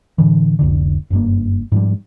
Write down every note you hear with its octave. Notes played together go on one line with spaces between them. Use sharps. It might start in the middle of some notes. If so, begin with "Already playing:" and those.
A2 D3 E3
F1 C2 D3
F#1 G2 A#3
G#2 F3 G3